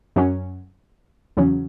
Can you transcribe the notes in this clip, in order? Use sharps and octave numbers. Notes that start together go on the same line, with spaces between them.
F#2 F#3 C#4
E2 C#3 F#3 C#4